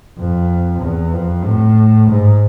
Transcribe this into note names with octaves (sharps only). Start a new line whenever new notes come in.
F2
E2
F2
A2
G#2